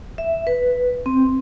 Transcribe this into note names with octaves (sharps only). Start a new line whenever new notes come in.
E5
B4
C4